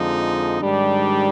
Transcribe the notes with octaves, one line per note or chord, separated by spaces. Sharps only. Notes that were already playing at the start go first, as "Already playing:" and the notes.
Already playing: F2 D3 F3 G#3 D#4
G#2 D#3 G3 D4 G4